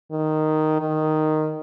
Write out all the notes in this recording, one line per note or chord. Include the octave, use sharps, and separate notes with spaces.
D#3
D#3